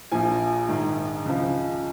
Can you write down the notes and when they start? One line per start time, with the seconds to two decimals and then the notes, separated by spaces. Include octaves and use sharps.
0.12 A#1 A#2 F3 G#5
0.69 A#1 G#2 D#3
1.26 C#2 C#3 F3